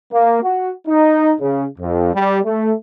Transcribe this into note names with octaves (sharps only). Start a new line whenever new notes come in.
A#3
F#4
D#4
C#3
F2
G3
A3